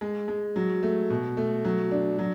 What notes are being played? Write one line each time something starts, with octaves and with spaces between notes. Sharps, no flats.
G#3
G#3
F#3
A3
B2
A3
F#3
D4
F#3